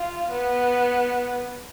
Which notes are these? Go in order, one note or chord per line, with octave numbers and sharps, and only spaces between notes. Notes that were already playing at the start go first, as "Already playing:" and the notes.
Already playing: F4
B3